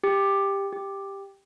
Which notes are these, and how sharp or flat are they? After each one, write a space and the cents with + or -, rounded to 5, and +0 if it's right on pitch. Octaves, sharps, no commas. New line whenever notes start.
G4 +10
G4 +5